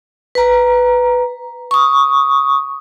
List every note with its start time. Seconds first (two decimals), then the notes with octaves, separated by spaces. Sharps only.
0.35 B4 A#5
1.71 C#6 D#6